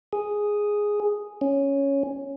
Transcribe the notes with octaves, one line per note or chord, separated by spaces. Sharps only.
G#4
C#4